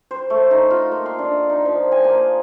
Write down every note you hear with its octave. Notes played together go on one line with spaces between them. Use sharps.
C5
A3
D#4
F4
A#3
C6
D4
D#4
F3
G#5
A#3